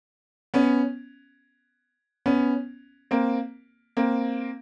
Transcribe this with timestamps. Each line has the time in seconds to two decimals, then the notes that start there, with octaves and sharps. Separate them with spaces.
0.54 B3 C#4
2.26 B3 C#4
3.11 A#3 C4
3.97 A#3 C4